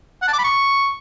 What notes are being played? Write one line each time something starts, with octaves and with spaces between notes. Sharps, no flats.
F#5
A5
D6
B5
C#6